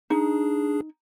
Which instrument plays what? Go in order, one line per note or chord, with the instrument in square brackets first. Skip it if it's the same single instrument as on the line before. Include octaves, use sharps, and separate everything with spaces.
[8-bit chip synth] D4 G#4 [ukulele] D#4